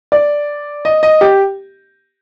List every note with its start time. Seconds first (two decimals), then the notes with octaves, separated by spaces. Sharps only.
0.12 D5
0.85 D#5
1.03 D#5
1.21 G4